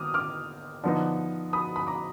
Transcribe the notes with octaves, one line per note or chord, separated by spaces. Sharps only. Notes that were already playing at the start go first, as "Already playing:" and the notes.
Already playing: D#3 B3 D6 D#6 F6
D6 F6
D3 F3 B3 D#4
B5 D#6
B5
A#5 D6